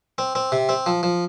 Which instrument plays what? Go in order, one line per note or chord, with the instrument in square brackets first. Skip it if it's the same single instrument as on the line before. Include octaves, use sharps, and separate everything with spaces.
[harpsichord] C4
C4
C3
C4
F3
F3